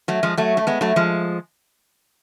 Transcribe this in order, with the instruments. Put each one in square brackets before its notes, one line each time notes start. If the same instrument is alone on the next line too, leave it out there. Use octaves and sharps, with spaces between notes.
[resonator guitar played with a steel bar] F#3 A3
F3 G#3
F#3 A3
A3
G#3 B3
F#3 A3
F3 G#3